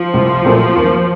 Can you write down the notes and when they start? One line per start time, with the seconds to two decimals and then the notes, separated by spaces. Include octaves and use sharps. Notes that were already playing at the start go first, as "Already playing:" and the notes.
Already playing: F3
0.14 C2
0.45 A#2 F#3 A3 C4
0.76 D#2